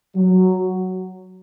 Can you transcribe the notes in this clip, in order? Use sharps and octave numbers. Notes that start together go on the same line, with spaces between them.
F#3